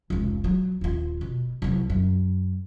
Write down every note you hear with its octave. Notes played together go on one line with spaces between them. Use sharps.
F1 C#2
F#3
D#1 F4
B2
C2 F#3
F#2